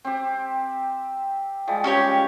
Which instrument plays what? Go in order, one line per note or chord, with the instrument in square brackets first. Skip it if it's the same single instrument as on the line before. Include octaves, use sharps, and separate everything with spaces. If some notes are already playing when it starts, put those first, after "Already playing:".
[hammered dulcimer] C4 G4
F3 G3 G#3
[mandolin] C#4 G4 C#5